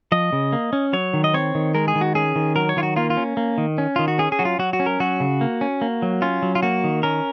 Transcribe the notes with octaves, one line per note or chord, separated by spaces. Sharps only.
F3 D#5
C#3
A#3
C#4
F#3 C#5
D#3
D#5
C4 C#5
D#3
G#3 A#4
G#4
D#3
F#4
C#4 G#4
D#3
F#3 A#4
C#5
D#3 F4
F#4
A#3 F4
F4
C#4
A#3
D#3
C#4
D#3 F4
F#4
C#4 G#4
G#4
F#3 F#4
F4
F#3 F#4
F#4
C#4
A#4
F#3 F#4
C#3
A#3
C#4
A#3
F#3
C#4 F4
F#3
F4
A#3 F#4
D#3
C#4 A#4